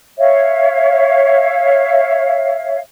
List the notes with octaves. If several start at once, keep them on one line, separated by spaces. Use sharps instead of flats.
C#5 E5 F5